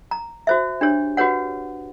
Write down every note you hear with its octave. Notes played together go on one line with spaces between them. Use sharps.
A#5
F#4 C5 E5
D4 G4 C#5
F#4 G4 B4 C#5 F#5